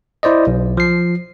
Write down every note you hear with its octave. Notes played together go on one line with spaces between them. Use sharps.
E4 C5 D5 D#5
B1
F3 C7